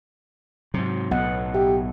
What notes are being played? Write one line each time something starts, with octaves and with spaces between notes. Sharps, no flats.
G#2 C3 F#3
B1 A2 B3 D#5 F#5
G4 E5